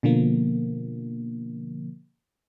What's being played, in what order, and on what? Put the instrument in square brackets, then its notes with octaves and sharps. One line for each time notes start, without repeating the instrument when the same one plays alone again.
[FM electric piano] B2 D3 F3 A#3